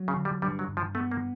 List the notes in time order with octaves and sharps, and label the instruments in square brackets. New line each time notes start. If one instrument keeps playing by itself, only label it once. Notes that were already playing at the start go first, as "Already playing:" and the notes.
Already playing: [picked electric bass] F#3
[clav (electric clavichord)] C#3
[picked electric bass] D3
[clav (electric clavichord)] G3
[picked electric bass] G2 [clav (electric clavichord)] G3
[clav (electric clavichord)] F#3
[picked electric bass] G2
[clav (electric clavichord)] F3
[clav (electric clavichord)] A3 [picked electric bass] B3
[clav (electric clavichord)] A#3